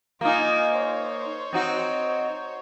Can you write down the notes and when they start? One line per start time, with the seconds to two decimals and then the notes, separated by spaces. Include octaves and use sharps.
0.21 A#3 D#4 F4 G#5
0.73 C5 C#5
1.53 C4 D#4 F#4